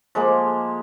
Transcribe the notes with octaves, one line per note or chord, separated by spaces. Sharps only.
F3 G#3 A#3